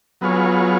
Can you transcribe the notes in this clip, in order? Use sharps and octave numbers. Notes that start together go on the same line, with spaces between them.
F#3 B3 F4 G#4 C#5